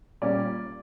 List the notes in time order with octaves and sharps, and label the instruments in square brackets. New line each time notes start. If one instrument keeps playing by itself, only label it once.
[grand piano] A#2 G3 A#3 C#4 D5